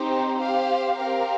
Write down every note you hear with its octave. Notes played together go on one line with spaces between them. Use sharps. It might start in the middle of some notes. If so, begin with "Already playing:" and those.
Already playing: C4 D#4 G4 C5
G4 C5 F5
C4 G4 A#4 F5